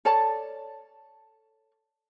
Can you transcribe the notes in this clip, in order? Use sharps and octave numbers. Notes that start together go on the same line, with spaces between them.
A4 C#5 D5 A5